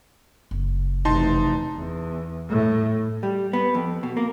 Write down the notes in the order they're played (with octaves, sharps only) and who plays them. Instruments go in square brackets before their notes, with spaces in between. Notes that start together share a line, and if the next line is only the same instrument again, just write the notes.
[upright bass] F#1
[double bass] F1 E3 [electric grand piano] D#4 A5 C6
[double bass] E2
A2
[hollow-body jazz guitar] G3
B3
F2
B2
A#3